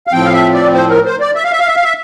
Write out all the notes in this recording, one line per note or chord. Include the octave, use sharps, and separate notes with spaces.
F5
A2 F3 C4 G5
F5
E5
D5
C5
A#4
C5
D5
E5
F5
E5
F5
E5
F5
E5